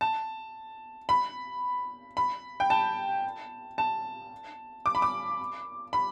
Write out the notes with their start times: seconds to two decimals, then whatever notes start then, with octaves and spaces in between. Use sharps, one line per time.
0.01 A5
1.09 B5
2.17 B5
2.60 G5
2.70 A5
3.78 A5
4.86 D6
4.95 B5
5.02 D6
5.93 B5